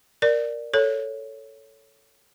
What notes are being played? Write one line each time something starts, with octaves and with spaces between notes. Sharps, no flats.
A#4 D5
A4 C#5